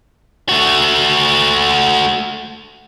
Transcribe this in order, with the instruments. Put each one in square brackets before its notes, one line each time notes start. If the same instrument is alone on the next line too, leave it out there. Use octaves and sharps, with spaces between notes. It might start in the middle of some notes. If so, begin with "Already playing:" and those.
[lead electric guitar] A3 F#4